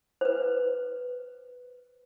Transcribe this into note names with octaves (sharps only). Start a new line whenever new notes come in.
B4 C5